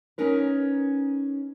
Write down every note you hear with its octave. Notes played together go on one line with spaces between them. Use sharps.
C#4 D#4 A#4 B4